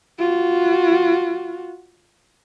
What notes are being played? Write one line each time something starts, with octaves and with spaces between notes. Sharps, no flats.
F4 F#4